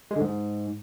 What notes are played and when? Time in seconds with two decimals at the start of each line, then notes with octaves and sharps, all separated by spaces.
0.11 G#3
0.16 D3
0.21 G#2